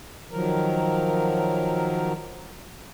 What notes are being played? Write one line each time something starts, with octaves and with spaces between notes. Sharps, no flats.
D#3 F3 F#3 A#4